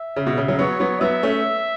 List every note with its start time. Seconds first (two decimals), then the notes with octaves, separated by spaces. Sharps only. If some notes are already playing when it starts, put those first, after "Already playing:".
Already playing: E5
0.16 C#3
0.26 B2
0.38 C#3
0.48 C#3 F#3
0.59 F#3 B3 C#5
0.80 F#3 B3
1.01 F#3 B3 E5
1.23 A3 C#4